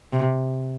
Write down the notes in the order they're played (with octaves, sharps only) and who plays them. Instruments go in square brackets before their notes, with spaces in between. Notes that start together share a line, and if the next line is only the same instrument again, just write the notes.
[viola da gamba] C3